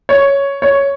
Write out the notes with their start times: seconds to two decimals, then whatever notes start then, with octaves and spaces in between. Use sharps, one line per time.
0.09 C#5
0.62 C#5